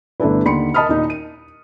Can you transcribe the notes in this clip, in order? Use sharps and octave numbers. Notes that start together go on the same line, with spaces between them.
G1 A3 D4 E4 B4
D#2 D3 B5 C6 C#7
A#4 D#5 A5 B5 D#6 F6
D#2 A#2 D#4
D#7